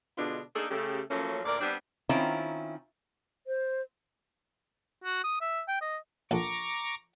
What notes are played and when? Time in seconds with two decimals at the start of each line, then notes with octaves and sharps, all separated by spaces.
0.18 B2 D3 G#3 B3 D4 F4
0.56 A#3 D4 D#4 G#4 A4
0.71 C#3 A3 G4
1.10 F3 F#3 A3 A#3 C#4
1.45 D2 A#2 A#4 D5
1.61 G3 B3 C4 D4
2.09 D#3 C4 C#4 E4 F4 A#5
3.47 C5
5.04 F#4
5.24 D#6
5.41 E5
5.68 G5
5.81 D#5
6.31 A#1 A4 A#5 C#6 D6